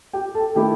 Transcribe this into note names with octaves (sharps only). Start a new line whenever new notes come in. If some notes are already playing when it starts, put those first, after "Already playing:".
G4 G5
A4 A5
D#3 A3 E4 G4 G5